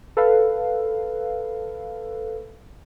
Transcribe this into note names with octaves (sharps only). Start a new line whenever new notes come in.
A4 B4 F5